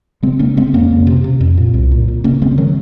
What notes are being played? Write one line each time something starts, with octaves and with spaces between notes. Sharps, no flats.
C#3 G#3 C4
C#3 A#3 C#4
C#3 G#3 C4
F2 A#3 C#4
F2
C3
C3
F2
A#2
C2
A#2
A#2
C#3 A#3 C#4
C#3 G#3 C4
D#3 F#3